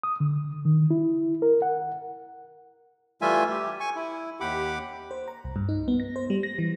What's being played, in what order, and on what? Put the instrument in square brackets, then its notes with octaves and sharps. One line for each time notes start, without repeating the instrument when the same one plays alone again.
[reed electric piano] D#6
D3
D#3
E4
A#4
F#5
[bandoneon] E3 G3 A3 F4 E5 G#5
G4
G#5 C#6
E4
D#2 G4 F#5 B5 D6
[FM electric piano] C5
A#5
C2
G2
D#4
B3
A#6
C5
G3
A#6
E3